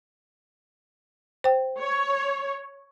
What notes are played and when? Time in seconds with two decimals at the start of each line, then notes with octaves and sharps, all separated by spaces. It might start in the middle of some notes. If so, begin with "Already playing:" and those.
1.44 C5 G5
1.80 C#5